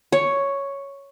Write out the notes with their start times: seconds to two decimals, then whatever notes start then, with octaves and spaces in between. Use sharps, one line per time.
0.12 C#5